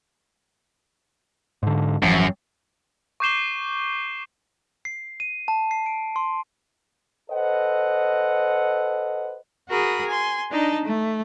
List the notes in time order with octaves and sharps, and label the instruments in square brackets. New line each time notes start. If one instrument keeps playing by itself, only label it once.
[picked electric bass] G#2 D3
[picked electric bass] G#1 E3 F3 [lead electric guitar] F#2
[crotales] C#6 D6 G6 C7 E7 G7
[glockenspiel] C7
D#7
A5
C7
D7
C6
[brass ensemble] A4 B4 C5 D#5 F#5
[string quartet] F#4 G#4 A#4 B5 D#6
G#5 C6
D4 D#4 D#5 A5
A3